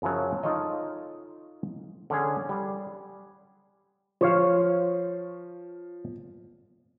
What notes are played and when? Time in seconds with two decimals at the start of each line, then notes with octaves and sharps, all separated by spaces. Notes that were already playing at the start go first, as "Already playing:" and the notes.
0.02 F#2 C#3 F3 F#3
0.43 D#4 F4 A4 C#5 D#5
2.10 D3 C#4 G#4
2.49 G3
4.21 F3 C5 C#5 F5